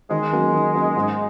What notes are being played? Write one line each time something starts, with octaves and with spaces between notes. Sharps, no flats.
D#3 G#3
F#3 A#3 C#4
D#3
F#3 A#3 C#4
G#2